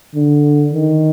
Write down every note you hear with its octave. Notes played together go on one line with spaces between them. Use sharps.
D3
D#3